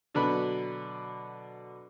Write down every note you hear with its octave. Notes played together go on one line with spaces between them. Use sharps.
B2 D3 F#3 D4 B4 B5